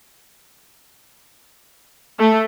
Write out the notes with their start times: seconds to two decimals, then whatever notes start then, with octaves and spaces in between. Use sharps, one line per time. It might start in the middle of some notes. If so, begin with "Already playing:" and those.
2.18 A3